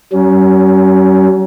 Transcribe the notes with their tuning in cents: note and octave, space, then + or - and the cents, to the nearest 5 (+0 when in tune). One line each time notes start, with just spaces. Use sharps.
F#3 +45 C#4 +15